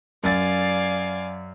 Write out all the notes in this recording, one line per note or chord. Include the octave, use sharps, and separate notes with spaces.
F#2 D5 F5 G#5 A6